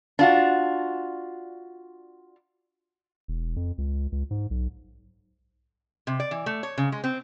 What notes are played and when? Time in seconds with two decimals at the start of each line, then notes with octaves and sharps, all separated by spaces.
0.19 D4 F4 F#4
3.28 E1
3.56 F2
3.78 C#2
4.12 C#2
4.31 G#2
4.51 B1
6.07 C3
6.20 D5
6.31 E3
6.46 A3
6.63 C#5
6.78 C#3
6.92 G#3
7.04 C4